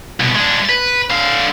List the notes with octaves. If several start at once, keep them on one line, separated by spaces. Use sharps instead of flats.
C2 B2
G#3 D4
B4
D3 F5